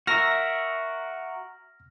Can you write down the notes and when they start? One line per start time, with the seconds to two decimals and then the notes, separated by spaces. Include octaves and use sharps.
0.07 F#4 A#4 E5 F6 A#6